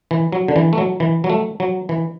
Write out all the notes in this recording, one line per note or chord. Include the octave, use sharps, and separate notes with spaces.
E3
F#3
D3
E3
A3
F#3
E3
F#3
A3
F#3
E3